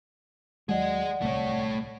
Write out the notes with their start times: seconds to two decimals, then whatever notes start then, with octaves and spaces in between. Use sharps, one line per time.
0.69 D#2 F#3 G#3 G#4 D5 D#5 F#5
1.22 D1 C2 A3 C#5